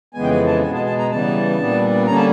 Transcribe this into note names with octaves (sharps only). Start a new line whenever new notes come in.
F2 C#3 E3 G#3 B3 G#5
G5
G#5
A5
B2 G#3 B3 G#5
A5
A5
A#5
C#3 E3 G3 B3 A5
A#2 G3 B3 D4
D3 G3 A#3 C#4 A#5
A5